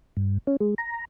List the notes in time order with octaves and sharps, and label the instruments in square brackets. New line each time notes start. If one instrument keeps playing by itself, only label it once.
[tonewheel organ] G2
C#4
G#3
A#5